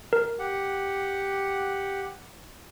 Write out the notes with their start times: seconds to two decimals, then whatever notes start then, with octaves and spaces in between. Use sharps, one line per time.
0.13 A#4
0.39 G4 F#5